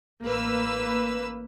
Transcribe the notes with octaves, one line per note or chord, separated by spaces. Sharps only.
A1 A#3 B4 E6